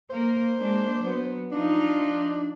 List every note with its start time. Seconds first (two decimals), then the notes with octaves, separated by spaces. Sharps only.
0.10 A#3 A#4 C5
0.60 G#3 A#3 D4
1.00 F#3 B3
1.52 F3 D4 D#4 F4